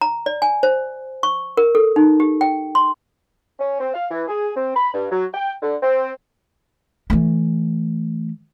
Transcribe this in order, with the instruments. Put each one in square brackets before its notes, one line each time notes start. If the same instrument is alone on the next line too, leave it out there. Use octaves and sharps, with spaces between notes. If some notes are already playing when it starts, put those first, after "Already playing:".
[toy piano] A#5
D5
G#5
C5
C#6
A#4
A4
D#4
G4
G5
C6
[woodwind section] C#4
C4
F5
E3
G#4
C4
B5
G2
F#3
G5
D3
C4
[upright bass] E3 A3